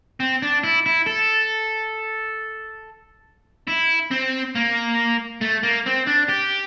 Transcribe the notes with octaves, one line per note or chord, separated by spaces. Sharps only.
C4
D4
E4
E4
A4
E4
C4
A#3
A3
A#3
C4
D4
G4